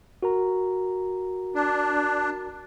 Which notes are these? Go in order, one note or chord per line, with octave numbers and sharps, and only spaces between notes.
F#4 A#4 A#5
D4